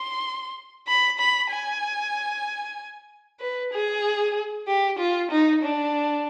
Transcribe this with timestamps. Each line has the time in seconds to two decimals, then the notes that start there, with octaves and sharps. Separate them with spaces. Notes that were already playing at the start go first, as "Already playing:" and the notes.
Already playing: C6
0.88 B5
1.19 B5
1.51 G#5
3.40 B4
3.72 G#4
4.67 G4
4.99 F4
5.31 D#4
5.63 D4